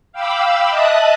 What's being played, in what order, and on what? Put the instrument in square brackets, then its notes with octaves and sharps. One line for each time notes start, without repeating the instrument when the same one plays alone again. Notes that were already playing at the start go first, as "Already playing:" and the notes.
[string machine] F5 G5 B5 D6 E6
D#5 E5 A5 D#6 F#6